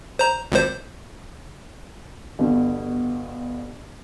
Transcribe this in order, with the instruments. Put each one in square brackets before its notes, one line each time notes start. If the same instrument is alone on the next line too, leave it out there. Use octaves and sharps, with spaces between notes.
[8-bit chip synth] C5 A#5
G#1 C#2 C5
[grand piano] G1 G2 B2